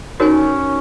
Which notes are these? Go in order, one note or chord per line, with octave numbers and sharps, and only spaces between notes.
C#4 D#4 F#4 A#4 C#5 G#5